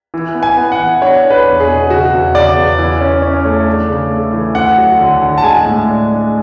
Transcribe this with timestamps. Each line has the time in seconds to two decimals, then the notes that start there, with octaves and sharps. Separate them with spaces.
0.14 E3
0.35 B3
0.43 G#5
0.57 B3
0.72 F#5
0.79 E3
1.02 D4 C#5
1.24 D4
1.30 B4
1.46 E2
1.60 G#4
1.68 B2
1.90 C#3 F#4
2.13 E2
2.34 C#3 D5
2.56 E2
2.78 E3
3.01 C#4
3.22 C#4
3.45 A3
3.67 D4
3.88 C#3
4.11 A3
4.33 E3
4.55 D2 F#5
4.78 F#3
4.99 D3
5.22 D3
5.38 A5
5.43 G#3 G#5
5.65 A2
5.88 D4
6.10 G#3